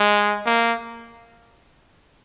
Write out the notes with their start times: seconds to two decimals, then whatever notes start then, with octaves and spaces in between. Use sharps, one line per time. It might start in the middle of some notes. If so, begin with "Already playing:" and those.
Already playing: G#3
0.46 A#3